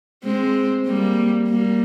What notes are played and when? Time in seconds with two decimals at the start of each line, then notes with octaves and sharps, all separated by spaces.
0.24 G#3 C4
0.86 G3 A#3
1.49 G3 A#3